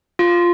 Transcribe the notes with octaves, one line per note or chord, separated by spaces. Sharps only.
F4